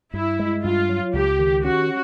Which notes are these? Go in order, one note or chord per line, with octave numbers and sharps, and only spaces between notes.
G2 E4
G#3
G2 F4
F#3
C#2 G4
D#3
C#4 F#4